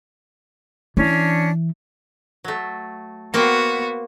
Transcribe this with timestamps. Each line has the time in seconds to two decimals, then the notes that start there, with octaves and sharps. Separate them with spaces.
0.97 E3 C#4 D4
2.44 F#3 A3
3.34 A#3 B3 F#4 C5 G5